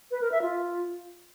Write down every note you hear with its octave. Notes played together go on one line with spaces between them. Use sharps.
B4
A#4
E5
F4